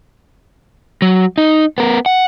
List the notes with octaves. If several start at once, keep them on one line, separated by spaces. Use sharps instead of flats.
F#3
D#4
B3 A#4
F#5